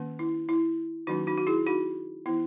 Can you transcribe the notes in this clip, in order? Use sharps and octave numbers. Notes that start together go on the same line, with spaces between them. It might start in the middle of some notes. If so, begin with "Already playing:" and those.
Already playing: D#3 A#3 C#4
E4
E4
D#3 F#3 A#3 C#4 D#4 F#4
D#4 F#4
F#4
E4 G#4
D#4 F#4
E3 B3 E4